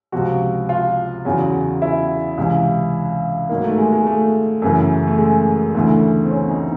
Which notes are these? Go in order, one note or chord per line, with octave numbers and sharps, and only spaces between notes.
C#2 C3 F3 F#4
F4
E2 C#3 F#3
E4
C#2 C3 E3
G#2 D#3 F#3 A#3
A3
G#3
G#3
A3
F#2 C#3 E3
A3
G#3
D2 C#3 E3 A3
C4
C#4
D#4